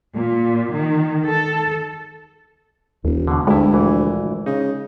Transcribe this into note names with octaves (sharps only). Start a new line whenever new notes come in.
A#2
D#3
A4
E1 D#2
B2 D3
D2 G2 G#3 E4
A#1 E3
C#3 D#4